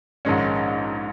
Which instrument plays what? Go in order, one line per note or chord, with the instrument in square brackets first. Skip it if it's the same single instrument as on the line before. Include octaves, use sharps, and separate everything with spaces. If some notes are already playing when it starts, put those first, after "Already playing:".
[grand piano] A#1 G#2 D#3 G#3 C#4